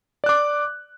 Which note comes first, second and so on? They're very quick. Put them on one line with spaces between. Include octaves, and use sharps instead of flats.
D5 F#6 D6